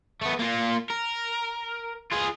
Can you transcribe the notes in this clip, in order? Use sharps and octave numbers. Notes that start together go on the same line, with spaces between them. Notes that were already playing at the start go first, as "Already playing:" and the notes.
A3 B3
A#3 F4
A#4
F4 G#4